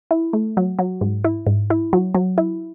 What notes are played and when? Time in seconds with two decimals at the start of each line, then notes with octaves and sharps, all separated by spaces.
0.11 E4
0.33 A3
0.57 F#3
0.79 F#3
1.01 G#2
1.25 E4
1.47 G#2
1.70 E4
1.93 F#3
2.15 F#3
2.38 E4